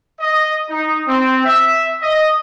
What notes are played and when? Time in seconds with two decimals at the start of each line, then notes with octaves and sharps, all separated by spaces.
0.20 D#5
0.70 D#4
1.07 C4
1.46 E5
2.02 D#5